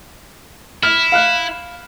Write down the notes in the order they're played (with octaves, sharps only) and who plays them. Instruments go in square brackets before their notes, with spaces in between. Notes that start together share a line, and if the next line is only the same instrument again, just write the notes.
[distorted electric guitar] E4 [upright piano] F6
[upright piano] F5 F6 F#6